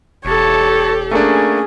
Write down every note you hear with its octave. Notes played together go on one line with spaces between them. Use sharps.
E1 G4 A4 C#5 A5
A3 A#3 C#4 D4 G#4